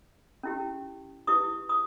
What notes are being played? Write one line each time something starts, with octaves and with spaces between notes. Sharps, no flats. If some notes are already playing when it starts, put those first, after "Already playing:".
C#4 E4 G4
E4 G4 B4 C#6 D#6
C#6 D#6